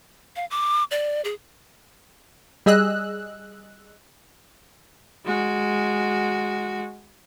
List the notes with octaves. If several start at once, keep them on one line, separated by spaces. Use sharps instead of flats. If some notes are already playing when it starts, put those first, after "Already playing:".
F5
D6
D5
G#4
G3 G#4 D#5 E6 F#6
G#3 F#4